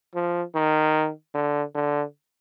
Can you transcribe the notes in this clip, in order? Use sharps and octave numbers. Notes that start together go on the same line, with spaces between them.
F3
D#3
D3
D3